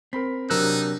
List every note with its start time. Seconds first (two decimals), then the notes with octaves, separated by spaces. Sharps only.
0.13 C4 A#4 B5 B6
0.50 C3 F#3 D4 D#4 A#4 E6 F#6